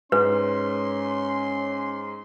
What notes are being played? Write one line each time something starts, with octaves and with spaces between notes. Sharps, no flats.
G#2 C#4 B4 C6